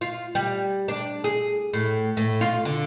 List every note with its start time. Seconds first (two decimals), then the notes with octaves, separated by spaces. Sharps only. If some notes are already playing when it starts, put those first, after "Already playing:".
0.01 F4
0.35 G3
0.88 D4
1.24 G#4
1.73 A2
2.17 A2
2.41 F4
2.65 D3